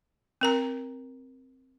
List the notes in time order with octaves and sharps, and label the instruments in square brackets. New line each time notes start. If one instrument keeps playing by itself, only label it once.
[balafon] C4 A#4 A#5